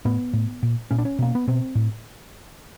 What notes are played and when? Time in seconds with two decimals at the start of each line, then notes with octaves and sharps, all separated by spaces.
0.05 A2 B3
0.33 A2
0.63 A#2
0.91 A#2 C#4
0.98 D4
1.05 C#4
1.19 B2 A#3
1.35 B3
1.48 B2 C4
1.75 A2